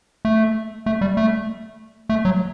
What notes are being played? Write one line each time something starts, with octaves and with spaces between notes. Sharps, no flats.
A3
A3
G3
A3
A3
F#3